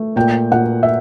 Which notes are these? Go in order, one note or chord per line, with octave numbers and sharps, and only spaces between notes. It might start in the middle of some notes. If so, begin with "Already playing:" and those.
Already playing: A3
A#2 G5
A#2 F#5
E5